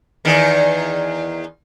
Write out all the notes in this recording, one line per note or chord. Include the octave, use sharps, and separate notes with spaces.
E2 D#3